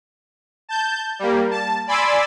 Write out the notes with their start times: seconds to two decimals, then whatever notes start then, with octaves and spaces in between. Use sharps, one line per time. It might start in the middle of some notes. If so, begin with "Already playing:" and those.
0.69 A5 G6
1.19 G3 A#3
1.51 A5
1.87 D5 G#5 B5 C6 D6 E6